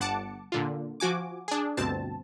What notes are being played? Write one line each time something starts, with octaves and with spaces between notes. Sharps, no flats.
G1 F#5 A5 D6 C#7
A#2 D3 F4
F3 F#4 G#5 D6
D4 G#4
G1 D2 B2 C4 A5